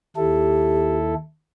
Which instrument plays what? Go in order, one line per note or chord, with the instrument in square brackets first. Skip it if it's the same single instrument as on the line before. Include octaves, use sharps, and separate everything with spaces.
[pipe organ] D#2 E4 A4 [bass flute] G4